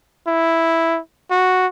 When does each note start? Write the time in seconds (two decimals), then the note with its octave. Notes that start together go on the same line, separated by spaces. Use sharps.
0.27 E4
1.31 F#4